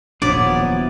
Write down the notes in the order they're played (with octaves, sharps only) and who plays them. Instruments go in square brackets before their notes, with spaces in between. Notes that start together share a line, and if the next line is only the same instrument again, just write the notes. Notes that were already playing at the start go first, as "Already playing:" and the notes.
[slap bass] D#1 A#2 D4 [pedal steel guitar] F3 B3 E4 [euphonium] F#3 [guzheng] D5